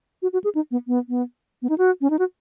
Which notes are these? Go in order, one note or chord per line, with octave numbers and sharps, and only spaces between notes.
F#4
F#4
G#4
D#4
B3
B3
B3
B3
D#4
F#4
C#4
D#4
F#4